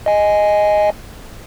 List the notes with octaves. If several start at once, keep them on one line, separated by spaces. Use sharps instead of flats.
D#5 G#5